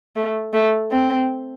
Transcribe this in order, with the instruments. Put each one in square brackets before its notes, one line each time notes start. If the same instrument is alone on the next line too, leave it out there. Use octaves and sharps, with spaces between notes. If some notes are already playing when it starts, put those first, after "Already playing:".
[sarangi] A3
A3
C4